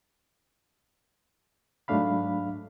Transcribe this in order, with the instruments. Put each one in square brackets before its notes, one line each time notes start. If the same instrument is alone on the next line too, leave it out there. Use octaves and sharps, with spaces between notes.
[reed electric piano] G#2 F#3 A3 D4 F5 B5